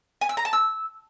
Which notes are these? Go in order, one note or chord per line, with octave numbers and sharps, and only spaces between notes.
G#5
E6
A#5
A5
E6